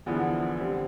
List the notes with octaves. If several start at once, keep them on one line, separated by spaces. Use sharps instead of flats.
E2 D3 F3 B3 E4
D3 G3 C4